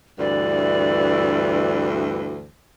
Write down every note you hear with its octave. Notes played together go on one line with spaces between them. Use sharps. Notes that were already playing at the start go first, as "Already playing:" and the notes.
D2 G2 E3 D5